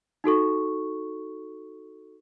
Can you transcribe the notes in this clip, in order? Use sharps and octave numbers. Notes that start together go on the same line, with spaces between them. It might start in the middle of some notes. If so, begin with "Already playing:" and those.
D#4 F#4 A4 C#6